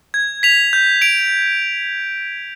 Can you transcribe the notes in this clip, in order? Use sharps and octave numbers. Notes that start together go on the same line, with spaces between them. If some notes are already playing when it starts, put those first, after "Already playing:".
G#6
B6 F7
G6
D7 F7